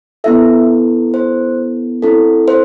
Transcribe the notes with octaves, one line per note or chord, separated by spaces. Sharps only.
B3 E4 A4 E5
C5
C4 E4 A4
C5